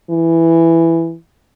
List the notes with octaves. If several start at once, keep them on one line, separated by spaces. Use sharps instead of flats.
E3